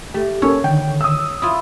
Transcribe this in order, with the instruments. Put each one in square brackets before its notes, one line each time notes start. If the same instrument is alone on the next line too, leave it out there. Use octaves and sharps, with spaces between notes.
[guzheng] A3 [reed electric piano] G4
[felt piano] A#3 C#4 A4 [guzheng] C#5
[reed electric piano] D3 D#3 [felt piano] G5
[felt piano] D#6 E6
[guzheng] E4 F4 [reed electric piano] D#6